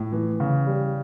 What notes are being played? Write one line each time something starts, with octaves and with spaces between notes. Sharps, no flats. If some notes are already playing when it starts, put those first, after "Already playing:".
Already playing: A2
E3
C#3
G3